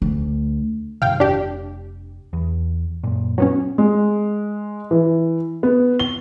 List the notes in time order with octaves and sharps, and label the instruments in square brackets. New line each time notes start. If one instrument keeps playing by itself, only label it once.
[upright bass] D2
[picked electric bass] G2 C3 D#3 [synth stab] F5 G5
[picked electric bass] F1 [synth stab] D4 G4
[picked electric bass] E2
F#2 A#2
[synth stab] F#3 B3 C#4
[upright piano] G#3
E3
B3
G7